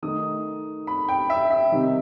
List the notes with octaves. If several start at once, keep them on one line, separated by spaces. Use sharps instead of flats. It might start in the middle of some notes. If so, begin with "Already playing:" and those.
D#3 A3 D#4 D#6
B5
G5
E5
E5
C3 D#3 G3 D#4